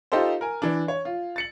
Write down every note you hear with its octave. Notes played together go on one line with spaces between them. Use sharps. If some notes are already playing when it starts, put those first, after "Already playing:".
D#4 F4 G4 A4 C5
A#4 G#5
E3 D4
C#5
F4
A6 C#7 F#7